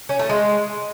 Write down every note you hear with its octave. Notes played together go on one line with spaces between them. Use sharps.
C#4
A3
G#3